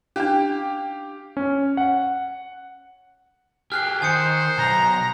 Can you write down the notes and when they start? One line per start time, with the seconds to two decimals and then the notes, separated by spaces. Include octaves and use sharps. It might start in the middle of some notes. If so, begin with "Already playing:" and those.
0.16 C#4 D4 G4 F5 G5
1.37 C#4
1.77 F#5
3.72 G4 G#4 F6 F#6 C7
4.02 D#3 C5 G#5 D#6 C#7
4.58 B1 A#5